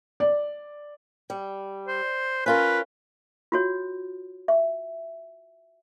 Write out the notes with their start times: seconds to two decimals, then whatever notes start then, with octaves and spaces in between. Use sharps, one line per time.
0.20 D5
1.30 G3
1.88 C5
2.46 C#4 F4 A#4 B4
3.52 F4 F#4 C#5
4.48 E5